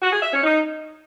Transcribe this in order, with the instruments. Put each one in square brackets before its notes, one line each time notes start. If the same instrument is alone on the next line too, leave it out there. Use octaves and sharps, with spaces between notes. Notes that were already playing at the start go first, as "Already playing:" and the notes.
[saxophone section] F#4
G#4
E5
C#4
D#4